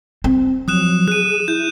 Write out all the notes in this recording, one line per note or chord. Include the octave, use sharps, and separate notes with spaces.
C4
F3 F#3 D#6 F#6 E7
G#4 F#6 D#7
E4 G6